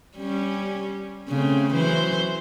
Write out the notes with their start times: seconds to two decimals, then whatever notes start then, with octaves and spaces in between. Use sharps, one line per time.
0.17 G3 C#4
1.29 C#3 A3 C4
1.74 E3 F#3 C5